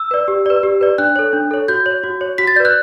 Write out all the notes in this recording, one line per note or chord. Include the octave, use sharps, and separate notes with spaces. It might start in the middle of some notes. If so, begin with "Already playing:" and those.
Already playing: E6
B4 D5
G4
B4 D5
G4
B4 D5
D4 F#6
A4 C#5
D4
A4 C#5
F#4 G6
C#5
F#4
C#5
F#4 B6
A6
B4 D5 G6
F#6